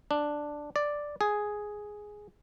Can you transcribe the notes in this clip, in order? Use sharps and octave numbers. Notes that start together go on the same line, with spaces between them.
D4
D5
G#4